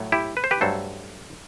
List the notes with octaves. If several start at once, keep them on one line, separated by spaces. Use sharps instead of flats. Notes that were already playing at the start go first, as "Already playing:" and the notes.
Already playing: A2 F#3 A3
E4 G4
B4
C5
G4 B4
G2 F#3 A3 A4 C5